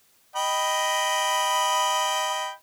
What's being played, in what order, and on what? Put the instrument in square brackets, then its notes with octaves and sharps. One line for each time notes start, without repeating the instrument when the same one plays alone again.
[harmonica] D#5 G5 B5